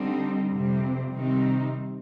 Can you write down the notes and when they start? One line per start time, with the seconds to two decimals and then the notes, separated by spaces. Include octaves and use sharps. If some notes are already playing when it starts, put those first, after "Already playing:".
Already playing: D3 G3 C4 D#4
0.50 F2 C3 G3 C4
1.12 C3 D#3 G3 C4 D#4